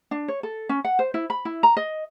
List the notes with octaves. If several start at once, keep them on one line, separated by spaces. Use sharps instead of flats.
D4
C#5
A4
C#4
F#5
C5
E4
B5
E4
A#5
D#5